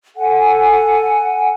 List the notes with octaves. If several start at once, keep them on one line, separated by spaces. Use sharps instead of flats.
A4 F#5 G#5